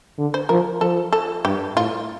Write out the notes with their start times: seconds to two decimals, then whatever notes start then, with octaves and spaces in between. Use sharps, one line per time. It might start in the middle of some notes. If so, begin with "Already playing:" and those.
0.18 D3
0.34 C5
0.49 F3 A#4
0.81 F3 A4
1.13 A4
1.45 G2 G4
1.76 A2 F4